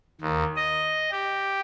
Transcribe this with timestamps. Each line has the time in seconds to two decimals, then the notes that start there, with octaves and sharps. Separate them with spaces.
0.21 D#2
0.56 D#5
1.12 G4